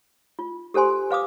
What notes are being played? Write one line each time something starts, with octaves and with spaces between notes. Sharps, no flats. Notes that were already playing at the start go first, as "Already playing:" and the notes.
F4
G4 A4 C5 G#5 C6
B4 F5 D6 D#6